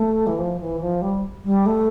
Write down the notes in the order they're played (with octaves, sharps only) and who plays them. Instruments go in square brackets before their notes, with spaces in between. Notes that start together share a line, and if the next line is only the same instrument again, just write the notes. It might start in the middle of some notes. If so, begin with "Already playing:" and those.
Already playing: [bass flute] A3
E3
F3
E3
F3
G3
G3
A3